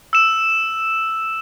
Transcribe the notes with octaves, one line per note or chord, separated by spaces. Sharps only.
E6 E7